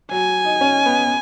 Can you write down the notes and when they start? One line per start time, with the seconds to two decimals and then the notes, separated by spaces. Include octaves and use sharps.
0.11 F#3 G#5
0.44 D#4
0.61 C#4
0.86 B3
1.05 B3